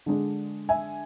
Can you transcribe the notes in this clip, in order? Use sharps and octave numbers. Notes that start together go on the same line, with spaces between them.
D3 G#3 D4
E5 G#5